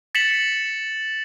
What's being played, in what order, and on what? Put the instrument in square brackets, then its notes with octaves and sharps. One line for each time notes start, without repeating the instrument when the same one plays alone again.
[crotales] A6 B6 C#7 E7 F#7